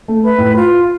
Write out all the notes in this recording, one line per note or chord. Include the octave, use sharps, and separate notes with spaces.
A3
B4 E5 B5
A2
F4